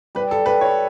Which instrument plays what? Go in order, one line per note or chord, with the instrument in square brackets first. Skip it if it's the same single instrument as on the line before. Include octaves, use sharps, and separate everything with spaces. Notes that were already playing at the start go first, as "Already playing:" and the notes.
[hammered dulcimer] G3 [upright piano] B4
[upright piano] A4
[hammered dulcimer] G3 [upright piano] B4
[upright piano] C#5